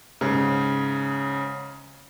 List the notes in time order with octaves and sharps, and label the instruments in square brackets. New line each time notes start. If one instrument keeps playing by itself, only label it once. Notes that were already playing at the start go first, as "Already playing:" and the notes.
[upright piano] G#2 C#3